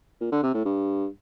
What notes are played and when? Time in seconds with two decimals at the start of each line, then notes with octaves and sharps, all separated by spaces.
0.21 A#2
0.32 D3
0.43 C3
0.54 A2
0.65 G2